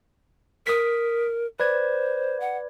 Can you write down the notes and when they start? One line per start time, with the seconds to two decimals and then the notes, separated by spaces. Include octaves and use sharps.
0.67 A#4 D#6 B6
1.60 B4 C5 D5 G#6
2.40 F#5